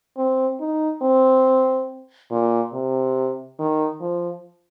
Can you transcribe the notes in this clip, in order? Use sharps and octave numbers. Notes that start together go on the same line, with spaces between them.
C4
D#4
C4
A#2
C3
D#3
F3